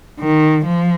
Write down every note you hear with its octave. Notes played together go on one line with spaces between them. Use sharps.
D#3
F3